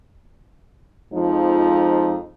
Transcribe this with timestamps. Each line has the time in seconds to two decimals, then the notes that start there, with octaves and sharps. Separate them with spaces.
1.14 F2 F3 G#3 D#4